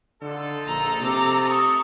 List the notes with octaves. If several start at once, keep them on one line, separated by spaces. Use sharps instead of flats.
D3 D#4 F4 A4
A#1 A#5
C3 A#5 D6
A3 A4 C#6 D#6